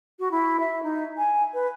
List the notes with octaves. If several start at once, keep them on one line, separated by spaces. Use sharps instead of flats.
F#4
E4
E5
D#4
G#5
B4